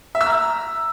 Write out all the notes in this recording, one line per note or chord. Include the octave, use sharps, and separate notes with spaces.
E5
E6
A#5